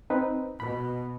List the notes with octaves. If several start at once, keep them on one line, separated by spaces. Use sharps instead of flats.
C4 D#4 B4
B2 B5